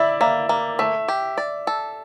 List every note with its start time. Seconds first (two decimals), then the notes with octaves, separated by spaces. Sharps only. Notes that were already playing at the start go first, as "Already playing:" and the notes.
Already playing: E4 D5 E5
0.21 A#3 E5
0.49 A#3
0.79 A3 E5
1.08 G4
1.38 D5
1.67 A4